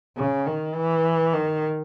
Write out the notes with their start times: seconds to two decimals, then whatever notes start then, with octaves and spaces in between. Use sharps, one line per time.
0.17 C#3
0.46 D#3
0.75 E3
1.33 D#3